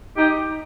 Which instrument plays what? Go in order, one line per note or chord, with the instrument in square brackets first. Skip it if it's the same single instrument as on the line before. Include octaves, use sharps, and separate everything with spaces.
[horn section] D#4 G4